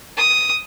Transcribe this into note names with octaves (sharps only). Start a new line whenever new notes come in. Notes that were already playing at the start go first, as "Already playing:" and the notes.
D#6